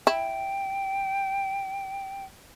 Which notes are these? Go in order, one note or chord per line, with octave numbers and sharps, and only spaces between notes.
E4 G5